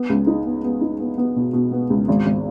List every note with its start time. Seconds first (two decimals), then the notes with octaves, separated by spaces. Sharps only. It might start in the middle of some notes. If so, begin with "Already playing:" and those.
Already playing: B3
0.10 C#2
0.27 D#4
0.45 B3
0.64 B3
0.81 D#4
1.00 B3
1.18 B3
1.36 B2
1.53 B2
1.72 B3
1.90 C#2
2.08 G#1
2.26 G#1